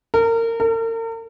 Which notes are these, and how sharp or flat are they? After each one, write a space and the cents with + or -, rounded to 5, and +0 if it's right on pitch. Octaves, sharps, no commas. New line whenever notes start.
A#4 -25
A#4 -40